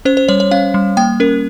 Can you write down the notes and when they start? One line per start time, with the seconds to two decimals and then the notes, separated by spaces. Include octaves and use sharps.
0.05 C#4 C5
0.17 C5
0.28 G3 C#5
0.40 C#5
0.51 C#4 F5
0.74 G3
0.97 A#3 G5
1.20 C#4 A#4